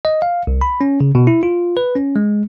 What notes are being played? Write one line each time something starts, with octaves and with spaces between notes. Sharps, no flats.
D#5
F5
C2
B5
C#4
C#3
B2
E4
F4
B4
C#4
G#3